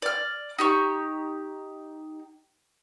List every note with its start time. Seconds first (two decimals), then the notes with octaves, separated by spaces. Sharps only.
0.02 D5 F6
0.59 D#4 G4 C#6